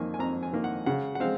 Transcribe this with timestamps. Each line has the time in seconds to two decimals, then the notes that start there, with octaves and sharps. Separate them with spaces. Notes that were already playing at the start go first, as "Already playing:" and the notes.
Already playing: F2 D#3 A#3 G#5
0.14 G#5
0.19 F2 A#5
0.43 G#5
0.53 D#3 A#3
0.64 F#5
0.86 C#3 F#5
1.15 F#5
1.20 G#3 C4 F5